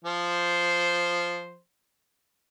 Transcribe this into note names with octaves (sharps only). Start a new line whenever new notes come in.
F3 C5